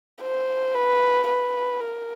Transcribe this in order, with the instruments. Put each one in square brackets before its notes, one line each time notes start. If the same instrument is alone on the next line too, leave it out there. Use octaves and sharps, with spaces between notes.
[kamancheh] C5
B4
B4
A#4